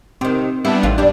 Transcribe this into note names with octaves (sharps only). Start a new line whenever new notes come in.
C3 D#3 C4
G3 B3 D4 E4
A1 D#2 F4
G2 G3 D4